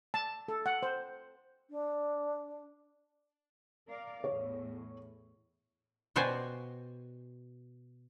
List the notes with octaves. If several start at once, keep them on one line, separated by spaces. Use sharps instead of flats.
A5
A4
F#5
C5
D4
A#4 D5 F5
E2 A2 C#5
B2 F#4 G4 C5 D5 G#5